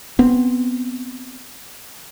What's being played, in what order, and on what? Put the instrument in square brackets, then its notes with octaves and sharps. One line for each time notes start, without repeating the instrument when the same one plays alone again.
[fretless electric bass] B3 C4